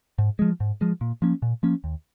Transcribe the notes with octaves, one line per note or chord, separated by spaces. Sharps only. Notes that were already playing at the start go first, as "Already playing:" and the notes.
G#2
F3 G#3
G#2
F3 G#3
A#2
F3 A#3 C#4
A#2
F3 A#3 C#4
D#2